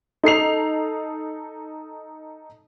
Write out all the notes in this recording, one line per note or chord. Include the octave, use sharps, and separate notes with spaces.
D#4 A4 C7 F7